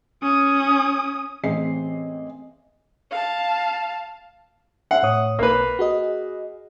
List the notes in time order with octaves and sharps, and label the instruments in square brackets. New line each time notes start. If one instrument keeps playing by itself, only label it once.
[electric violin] C#4 D#6
[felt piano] A1 C4 G#4 D#5 C7
[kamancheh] F5 A5
[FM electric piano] E5 [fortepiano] F#5
[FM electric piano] A2 C#5 D#6
[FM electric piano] B1 [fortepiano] A#3 B4
[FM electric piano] F#4 G#4 D#5